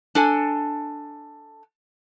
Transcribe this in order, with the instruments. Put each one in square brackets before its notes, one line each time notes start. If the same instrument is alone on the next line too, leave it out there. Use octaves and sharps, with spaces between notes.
[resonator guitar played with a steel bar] D4 A4 G#5